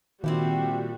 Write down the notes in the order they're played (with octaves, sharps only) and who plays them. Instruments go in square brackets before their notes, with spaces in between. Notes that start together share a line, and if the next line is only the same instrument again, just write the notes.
[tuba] A#2 [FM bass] D#3 [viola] G3 F#4 [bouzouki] C4 E4 G4